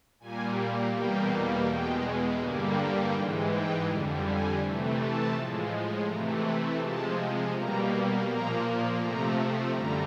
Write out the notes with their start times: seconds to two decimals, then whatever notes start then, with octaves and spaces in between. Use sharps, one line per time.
0.20 A#2 G3 A#3 G#5
0.93 E2 B2 G3 A#3 G5
1.67 E2 B2 G#3 G5
2.40 G2 D3 G3 A#3 G#5
2.76 G5
3.13 G#2 E3 G#3 G5
3.50 G5
3.86 F2 D3 G3
4.24 G#5
4.59 C3 E3 A3
4.97 A5
5.33 A2 F3 G#3
6.06 C3 E3 A3 A#5
6.42 B5
6.79 C3 F3 G#3 A5
7.53 B2 G3 A#3 A#5
8.25 A#2 F3 A#3 A#5
8.98 C3 F3 A3 A#5
9.72 F#2 D3 G3 A#5